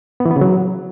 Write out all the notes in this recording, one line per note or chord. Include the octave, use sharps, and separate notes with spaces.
B3
E3
B3
C#3
F#3